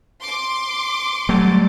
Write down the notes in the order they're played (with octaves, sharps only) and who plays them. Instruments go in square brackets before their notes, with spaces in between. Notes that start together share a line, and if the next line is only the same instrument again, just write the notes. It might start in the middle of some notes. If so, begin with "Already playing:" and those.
[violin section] C6 D6
[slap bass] F#3 G3 A3